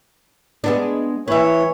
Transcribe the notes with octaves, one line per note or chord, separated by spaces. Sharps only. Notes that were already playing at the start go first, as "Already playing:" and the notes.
G#3 B3 D4
E3 B4 C#5 E5